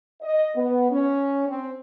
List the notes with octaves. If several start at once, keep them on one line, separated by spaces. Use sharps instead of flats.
D#5
B3
C#4
C4